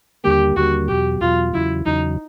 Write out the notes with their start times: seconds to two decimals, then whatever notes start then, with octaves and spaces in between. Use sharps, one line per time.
0.24 D#2 D3 G3 A#3 G4
0.56 D#2 D3 G3 A#3 F#4
0.88 E2 B2 F#3 G4
1.21 E2 B2 F#3 F4
1.53 E2 C#3 F#3 E4
1.85 E2 C#3 F#3 D#4